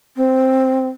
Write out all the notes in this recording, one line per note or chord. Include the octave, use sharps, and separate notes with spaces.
C4